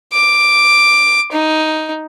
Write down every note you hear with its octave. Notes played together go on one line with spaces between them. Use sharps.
D6
D#4